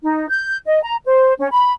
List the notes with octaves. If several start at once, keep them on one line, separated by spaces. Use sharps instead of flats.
D#4
G6
D#5
A#5
C5
C#4
B5